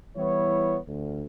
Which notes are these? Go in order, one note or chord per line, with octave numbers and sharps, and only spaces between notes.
E3 G3 B3 E4 C#5
D2